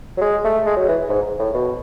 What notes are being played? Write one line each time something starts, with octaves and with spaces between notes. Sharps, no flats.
F#3
G#3
A3
G#3
F#3
E3
G#2
A2
B2